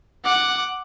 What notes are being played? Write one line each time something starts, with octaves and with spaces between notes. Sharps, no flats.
F#5 D6